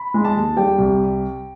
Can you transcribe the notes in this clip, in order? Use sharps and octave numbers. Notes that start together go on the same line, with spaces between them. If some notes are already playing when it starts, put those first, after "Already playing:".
Already playing: B5
G#3
A5
D#2
G3 G5
C2